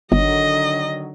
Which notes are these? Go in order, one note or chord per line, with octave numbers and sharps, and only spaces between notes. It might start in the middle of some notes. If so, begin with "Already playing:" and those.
G1 D3 D#3 F#3 D#5